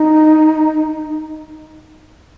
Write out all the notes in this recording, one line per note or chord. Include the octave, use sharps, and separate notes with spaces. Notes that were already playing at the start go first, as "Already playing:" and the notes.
Already playing: D#4